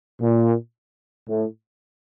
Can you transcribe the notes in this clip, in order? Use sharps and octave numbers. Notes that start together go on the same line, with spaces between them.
A#2
A2